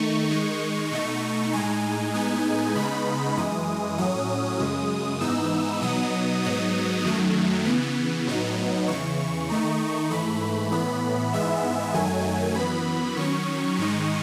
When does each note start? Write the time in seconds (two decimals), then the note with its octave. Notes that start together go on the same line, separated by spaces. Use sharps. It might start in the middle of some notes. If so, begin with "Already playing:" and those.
Already playing: D#3 A3 D#4 C#6
0.30 D#3 G#3 D#4
0.91 B2 A3 D#4 C#6
1.53 A2 G#3 D#4 G#5
2.14 A2 G#3 B3 D#4
2.75 C#3 G#3 B3 D#4 B5
3.36 F#2 E3 G#3 D#6
3.98 A2 F#3 C#4 D#6
4.59 F#2 C#3 G#3
5.20 G#2 E3 B3 D#4 E6
5.82 B2 F#3 B3 D#4 D#6
6.43 G#2 F#3 B3 D#4
7.04 F#2 D#3 F#3 A3
7.65 C#3 E3 B3
8.27 A2 F#3 B3 D#4
8.88 E2 C#3 E3 C#6
9.49 D#3 A3 D#4
10.10 G#2 E3 A3 B5
10.72 A2 E3 B3
11.33 G#2 E3 G#3 B3 E5
11.94 F#2 D#3 F#3 A3 G#5
12.55 F#2 E3 B3 B5
13.17 D#3 F#3 C#4 C#6
13.78 G#2 D#3 G#3 D#4